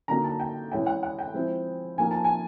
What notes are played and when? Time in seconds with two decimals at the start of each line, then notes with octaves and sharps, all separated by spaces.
0.08 D3 F#3 A#3 D#4 A#5
0.24 A5
0.40 G5
0.71 E3 G#3 C#4 E4 G5
0.87 F#5
1.03 F#5
1.19 G5
1.34 F3 G#3 C4 E4
1.98 F3 A#3 D#4 G#5
2.11 A5
2.24 G#5